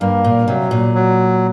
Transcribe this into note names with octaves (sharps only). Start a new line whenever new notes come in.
G2 A#3
A#2
C3 F#3
A#2
F#3